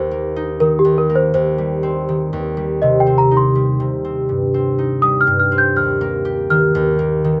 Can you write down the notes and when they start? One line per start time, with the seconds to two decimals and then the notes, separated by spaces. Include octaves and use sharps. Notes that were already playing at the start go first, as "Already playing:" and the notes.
Already playing: D#2 C5
0.11 A#3
0.36 D#4
0.60 D#3 A#4
0.79 G4
0.85 D#2
0.98 A#4
1.09 A#3
1.15 C5
1.34 D#2 C5
1.58 G3
1.83 C4
2.09 D#3
2.33 D#2
2.57 G3
2.82 C3 D#5
3.00 G5
3.07 C4
3.18 A#5
3.31 D#4
3.37 C6
3.55 G3
3.80 C3
4.05 C4
4.29 G2
4.54 C4
4.78 D#4
5.02 G3 D#6
5.21 F6
5.27 G2
5.39 F6
5.52 C4
5.58 G6
5.76 D#2 F6
6.01 A#3
6.25 G4
6.50 D#3 F6
6.75 D#2
6.99 A#3
7.24 D#3